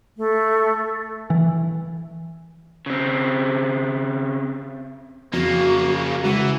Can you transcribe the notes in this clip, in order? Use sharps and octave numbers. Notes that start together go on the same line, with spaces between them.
A3
E3
C#3 C4
F2 C#3 A#3 F#4
C#2 E3 F#5